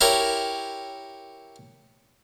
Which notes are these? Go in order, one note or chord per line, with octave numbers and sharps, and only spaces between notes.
E4 G4 A#4 C#5 E5